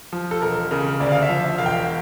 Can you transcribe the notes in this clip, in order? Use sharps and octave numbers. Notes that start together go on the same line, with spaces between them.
F3
A4
E1 A#4
C#3 A#4
D2 D5
F5
E5
F3
E5
E1 F5
G5